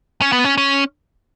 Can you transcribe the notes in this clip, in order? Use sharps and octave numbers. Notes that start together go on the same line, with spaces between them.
C#4
B3
C#4
C#4